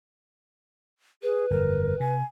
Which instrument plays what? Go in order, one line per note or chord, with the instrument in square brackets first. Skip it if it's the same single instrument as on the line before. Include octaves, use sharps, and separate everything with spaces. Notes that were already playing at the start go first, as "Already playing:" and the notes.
[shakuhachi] G#4 [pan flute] B4
[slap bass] G1 F2 [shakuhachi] A#4
[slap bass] C3 [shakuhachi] G#5